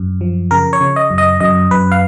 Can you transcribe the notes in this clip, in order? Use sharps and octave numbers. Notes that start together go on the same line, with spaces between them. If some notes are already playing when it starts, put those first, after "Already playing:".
Already playing: F#2
F3
C#3 A#4
C#5
C#3
D#5
F#2
D#5
F#2 D#5
F#2 B4
F5